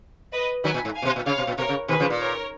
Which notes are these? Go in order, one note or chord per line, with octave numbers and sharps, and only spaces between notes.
B4 D#5
D#3 F#3 G#5 B5
A#2
G#2
F5 G#5
A#2
B2
A#2
C#3 C#5 F5
B2
A#2
B2 A#4 C#5
C#3
B2 D#3 G#4 B4
C#3 F3
A#2
A#4 C#5